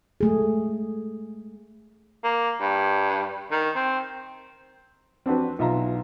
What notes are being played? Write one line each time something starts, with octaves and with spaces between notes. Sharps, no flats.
G#3 A3 G#4
A#3
G2
D#3
C4
C4 D4 F#4 B4
B1 F4 E5 A#5